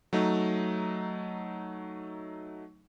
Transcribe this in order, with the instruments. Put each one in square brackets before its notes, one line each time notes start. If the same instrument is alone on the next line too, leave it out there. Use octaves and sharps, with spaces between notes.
[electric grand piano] F#3 A3 D#4